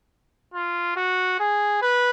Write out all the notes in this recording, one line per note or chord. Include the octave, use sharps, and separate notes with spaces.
F4
F#4
G#4
B4